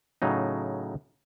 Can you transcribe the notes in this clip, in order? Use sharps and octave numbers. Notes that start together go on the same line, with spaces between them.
A2 C#3 F#3 D#4